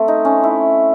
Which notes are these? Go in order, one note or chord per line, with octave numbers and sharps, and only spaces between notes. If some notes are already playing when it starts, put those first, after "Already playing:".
Already playing: A3 C4
D#4
C#4
E4